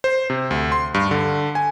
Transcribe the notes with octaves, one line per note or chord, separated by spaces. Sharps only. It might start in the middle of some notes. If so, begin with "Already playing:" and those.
C5
C3
D2
C6
G2
D3
G#5